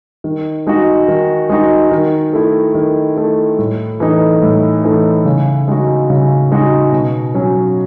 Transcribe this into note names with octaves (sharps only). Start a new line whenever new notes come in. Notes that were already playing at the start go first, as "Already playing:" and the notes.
D#3
G#3 D#4 F#4
D#3
G#3 D#4 F#4
D#3
A3 E4
D#3
A3 E4
A2
E3 A3 D#4
A2
E3 A3 D#4
C#3
G#3 D#4 F#4
C#3
G#3 D#4 F#4
B2
F#3 C#4